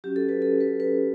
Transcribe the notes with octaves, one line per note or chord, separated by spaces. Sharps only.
F#3 C#4 F#4 G4
A4
B4
A4
B4
B4